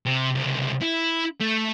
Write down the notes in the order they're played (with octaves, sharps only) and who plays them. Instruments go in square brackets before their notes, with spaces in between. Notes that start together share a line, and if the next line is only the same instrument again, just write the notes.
[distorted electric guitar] C3
C#2 C3
E4
A3